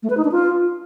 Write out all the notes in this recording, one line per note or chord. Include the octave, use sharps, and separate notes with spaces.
A3
B4
D#4
D4
F4